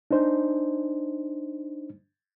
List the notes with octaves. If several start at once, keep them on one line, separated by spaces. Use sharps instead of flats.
D4 D#4 C5